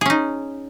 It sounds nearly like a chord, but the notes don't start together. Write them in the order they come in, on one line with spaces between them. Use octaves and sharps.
G#4 C#4 D#4